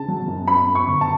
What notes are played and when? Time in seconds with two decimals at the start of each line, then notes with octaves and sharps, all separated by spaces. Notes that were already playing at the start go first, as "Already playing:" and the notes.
Already playing: C#3 A5
0.08 F#3
0.28 F#2
0.48 F#2 B5
0.67 F#2
0.75 C#6
0.87 G1
1.01 A5